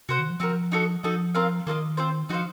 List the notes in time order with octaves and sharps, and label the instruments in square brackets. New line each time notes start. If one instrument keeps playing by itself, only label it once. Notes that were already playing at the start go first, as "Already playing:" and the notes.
[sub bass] C3 [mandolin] F#4 C5 F#5
[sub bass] D#3
F3
[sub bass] F3 [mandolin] C4 F#4 A#4
[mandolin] D#4 F#4 A4
[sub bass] F3 [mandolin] D#4 F#4 A4 D#5
[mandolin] C4 F4 A#4 F5
[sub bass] D#3 [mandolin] A#3 F4 A4 D#5
[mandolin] C4 F4 C5
[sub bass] F3 [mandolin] D#4 F#4 C5 F5